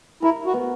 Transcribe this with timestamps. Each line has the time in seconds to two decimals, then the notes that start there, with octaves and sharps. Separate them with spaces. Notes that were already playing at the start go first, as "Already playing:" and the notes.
0.22 E4 A#4
0.46 F#4
0.54 B3